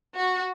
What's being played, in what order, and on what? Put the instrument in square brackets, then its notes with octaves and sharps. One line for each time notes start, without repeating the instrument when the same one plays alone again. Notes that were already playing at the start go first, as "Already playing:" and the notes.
[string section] F#4